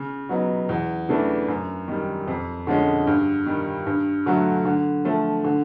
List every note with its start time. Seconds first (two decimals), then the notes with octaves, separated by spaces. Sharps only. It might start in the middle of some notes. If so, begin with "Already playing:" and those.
Already playing: C#3
0.29 F#3 B3 D#4
0.69 E2
1.09 C#3 E3 A3 D4
1.48 F#2
1.88 D#3 G3
2.28 F2
2.67 D3 F3 G#3 C#4
3.07 G2
3.46 D#3 G3
3.86 G2
4.26 D3 F#3 A3
4.65 D3
5.05 F3 A3
5.44 D3